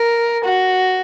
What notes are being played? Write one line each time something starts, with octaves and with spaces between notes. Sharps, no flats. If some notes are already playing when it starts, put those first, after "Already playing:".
Already playing: A#4
F#4